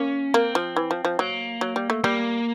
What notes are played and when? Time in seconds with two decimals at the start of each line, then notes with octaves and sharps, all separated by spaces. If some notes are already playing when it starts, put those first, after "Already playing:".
Already playing: A#3 C#4
0.33 A#3 C4
0.55 F3
0.76 E3
0.91 F3
1.05 F3
1.19 F#3 A#3
1.61 F#3
1.76 G3
1.90 A3
2.04 G3 A#3